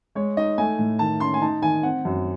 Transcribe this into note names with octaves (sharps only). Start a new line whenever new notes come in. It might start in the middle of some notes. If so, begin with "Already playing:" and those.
G#3 C#5
D#4 D#5
A3 G#5
A2
D#3 A5
C#4 C6
G#5
D#4 A5
D#3 G#5
C4 F#5
F#2